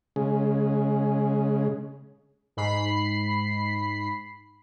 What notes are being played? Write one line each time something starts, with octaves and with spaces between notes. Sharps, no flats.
C#3 G#3
G#2 B5 C7